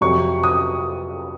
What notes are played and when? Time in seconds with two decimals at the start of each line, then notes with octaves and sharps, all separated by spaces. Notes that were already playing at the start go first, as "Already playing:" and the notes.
0.01 F2 C3 F#3 C#6
0.43 D#6